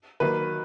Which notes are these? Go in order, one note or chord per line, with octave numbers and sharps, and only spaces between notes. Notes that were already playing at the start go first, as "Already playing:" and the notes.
D#3 F#3 A#3 B4